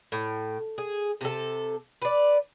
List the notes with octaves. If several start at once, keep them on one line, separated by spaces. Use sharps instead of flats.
A2
G#4
C3 A4
B4 D5